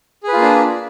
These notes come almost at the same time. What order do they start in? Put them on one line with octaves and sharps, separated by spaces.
G#4 B4 F4 A#3 D4